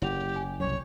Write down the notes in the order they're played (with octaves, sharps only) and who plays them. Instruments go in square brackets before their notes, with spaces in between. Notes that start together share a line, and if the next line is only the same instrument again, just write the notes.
[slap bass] F#1 [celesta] E4 F#5 F7 [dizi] G4
[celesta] G#5
[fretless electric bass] C2 F#2 [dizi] C#5